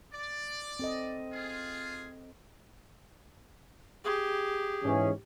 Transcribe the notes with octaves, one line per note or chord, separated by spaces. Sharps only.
D5
C4 A4 D#5
F4 G#4
G4 G#4
G#2 E3 C#4